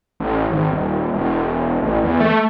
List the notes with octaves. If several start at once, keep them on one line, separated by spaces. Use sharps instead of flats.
A1
G#1
D#1
E1
A1
E2
A3